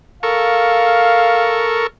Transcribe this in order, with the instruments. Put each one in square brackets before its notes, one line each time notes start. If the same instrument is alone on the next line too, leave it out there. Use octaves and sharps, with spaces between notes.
[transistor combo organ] A4 A#4 C#6 [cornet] F5